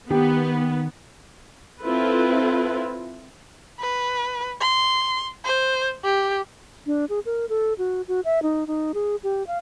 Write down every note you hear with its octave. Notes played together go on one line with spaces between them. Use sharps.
D#3 B3 G4
C4 E4 F4 A4 B4
B4
C6
C5
G4
D4
G#4
A#4
A4
F#4
F#4
E5
D#4
D#4
G#4
G4
F5